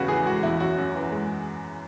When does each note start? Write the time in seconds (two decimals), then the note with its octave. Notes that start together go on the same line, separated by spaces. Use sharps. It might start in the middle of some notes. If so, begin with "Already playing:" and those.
Already playing: E2 C#3 G#3 F#4 B4
0.08 E3 G#4
0.25 G#3 F#4
0.43 E2 E4
0.60 F#2 F#4
0.78 F#2
0.95 E3
1.12 G#3